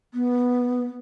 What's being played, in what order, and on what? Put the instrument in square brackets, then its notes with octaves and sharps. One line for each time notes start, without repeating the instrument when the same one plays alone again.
[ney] B3